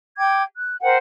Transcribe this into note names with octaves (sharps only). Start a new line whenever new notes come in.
G5 D6 G#6
F#6
A#4 C5 F#5 G5